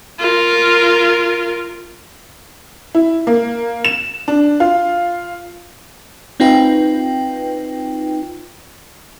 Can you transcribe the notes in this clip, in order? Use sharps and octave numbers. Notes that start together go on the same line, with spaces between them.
F4 A#4
E4
A#3
E7
D4
F4
C4 D#4 F4 B4 G5